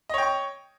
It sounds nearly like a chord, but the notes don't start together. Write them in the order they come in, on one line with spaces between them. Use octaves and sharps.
D#5 C#5 G5 C#6